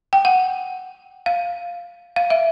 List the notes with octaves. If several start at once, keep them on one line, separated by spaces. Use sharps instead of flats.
G5
F#5
F5
F5
E5